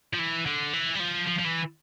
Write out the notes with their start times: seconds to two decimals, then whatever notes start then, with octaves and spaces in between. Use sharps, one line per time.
0.13 F3
0.19 E3
0.46 D3
0.73 E3
0.95 G3
1.00 F3
1.27 F3
1.39 F3
1.45 E3